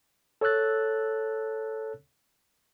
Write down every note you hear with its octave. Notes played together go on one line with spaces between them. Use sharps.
A4 C#5 A5 E6 F#6 A6